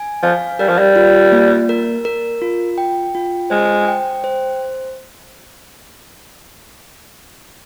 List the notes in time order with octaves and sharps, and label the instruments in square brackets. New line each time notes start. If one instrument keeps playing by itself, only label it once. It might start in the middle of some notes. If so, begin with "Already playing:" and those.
Already playing: [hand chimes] G#5
[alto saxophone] F3 [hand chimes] F5
[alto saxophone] G3 [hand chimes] A#4
[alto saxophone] F3
G3
[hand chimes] F4
A#3
A#4
A#4
F4
G5
F4
[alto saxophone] G#3 [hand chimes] C5
[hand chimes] G5
C5